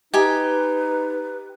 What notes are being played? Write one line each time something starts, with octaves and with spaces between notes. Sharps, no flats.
D#4 G4 B4 D#5 G#5